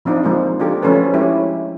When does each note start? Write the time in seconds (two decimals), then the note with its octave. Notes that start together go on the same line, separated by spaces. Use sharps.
0.05 F3 C4 D4 D#4
0.23 F3 G#3 A#3 D4 F4
0.60 D4 F4 G4 A4 A#4
0.82 F3 A3 C#4 F#4 A4 B4
1.13 F3 G#3 C#4 E4 G4 C#5